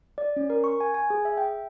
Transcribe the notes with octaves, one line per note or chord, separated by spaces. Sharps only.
D5
C#4
A#4
C#6
G#5
G#5
G#4
E5
G5